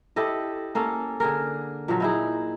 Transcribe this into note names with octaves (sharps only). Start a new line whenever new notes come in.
E4 G4 A4 D#5
A#3 C#4 A4
D3 G#4 A#4
A#2 F3 F#3
D#4 E4 G#4